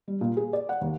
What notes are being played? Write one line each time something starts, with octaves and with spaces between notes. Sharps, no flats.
G3
A#2
G#4
D5
F#5
D#2